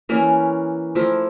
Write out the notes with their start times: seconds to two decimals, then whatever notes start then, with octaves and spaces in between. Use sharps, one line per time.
0.09 E3 A#3 C#4 E4
0.95 F3 A3 E4 A#4